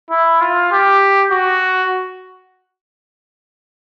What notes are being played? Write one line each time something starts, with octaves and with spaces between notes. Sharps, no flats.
E4
F4
G4
F#4